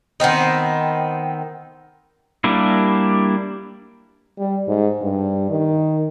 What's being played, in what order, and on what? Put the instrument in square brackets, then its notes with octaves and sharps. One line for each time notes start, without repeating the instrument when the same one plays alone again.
[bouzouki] D#3 B3 C4 D#4
[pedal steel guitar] G3 A#3 D4 E4
[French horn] G3
G#2
G2
D#3